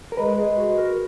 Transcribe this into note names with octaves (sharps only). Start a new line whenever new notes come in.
A#4
G#3 B4
G#3
F#4
A#4